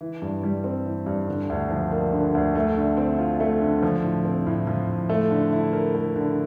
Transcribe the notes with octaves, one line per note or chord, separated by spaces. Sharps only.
E3
G2
G3
C4
E3
G2
D3
D2
F3
A#3
D3
D2
A3
D3
C4
F4
A3
D3
F3
A2
C4
A2
F3
A2
A3
D3
E4
A#4
A3
D3